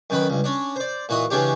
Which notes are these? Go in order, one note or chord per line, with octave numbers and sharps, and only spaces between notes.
F#2 D#3 B4 B5
C#2 G2
C#4 D4
C5 D5
A#2 E3 F#4 D#5 D#6
C#3 E3 G#3 C#4 D4 G4